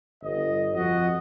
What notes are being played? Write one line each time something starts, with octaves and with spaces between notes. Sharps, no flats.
G1 D#5
F2 F3 F#4 D#5